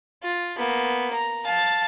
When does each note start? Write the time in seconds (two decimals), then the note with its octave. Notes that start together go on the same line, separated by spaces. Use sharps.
0.23 F4
0.57 A#3 B3
1.13 A#5
1.45 F5 A5